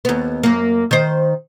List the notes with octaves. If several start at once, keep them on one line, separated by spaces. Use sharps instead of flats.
D#2 B3
F#2 A#3
D#3 C5